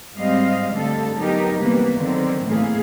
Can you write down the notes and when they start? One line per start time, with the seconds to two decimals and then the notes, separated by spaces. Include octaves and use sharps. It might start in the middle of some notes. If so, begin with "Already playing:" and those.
0.17 G#2 G3 C4 D#5 F5
0.71 D3 G3 A3 A4
1.16 F#3 B3 D#4 G4 A#4
1.58 C3 E3 G3 A#3 B3 B4
1.96 D3 D#3 F#3 C4
2.45 A2 E3 A#3 B3 G#4 F5